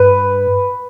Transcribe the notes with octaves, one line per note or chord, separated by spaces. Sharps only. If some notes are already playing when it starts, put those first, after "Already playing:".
Already playing: G2 B4